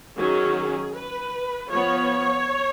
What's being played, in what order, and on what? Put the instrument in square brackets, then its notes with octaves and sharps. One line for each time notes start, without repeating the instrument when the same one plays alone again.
[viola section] D#3 F#3 C#4 G#4
B4
F3 B3 C#5